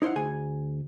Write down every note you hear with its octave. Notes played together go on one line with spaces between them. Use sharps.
D#4 E4 C5 F5 F#5
D2 G#4 G#5